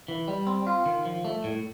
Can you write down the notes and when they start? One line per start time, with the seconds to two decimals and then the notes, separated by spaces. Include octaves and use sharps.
0.08 E3
0.28 G3
0.47 C4
0.67 F4
0.86 D#3
1.05 F3
1.25 A3
1.44 A2